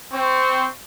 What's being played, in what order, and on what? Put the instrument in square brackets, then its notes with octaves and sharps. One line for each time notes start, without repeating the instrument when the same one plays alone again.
[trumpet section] C4 C#6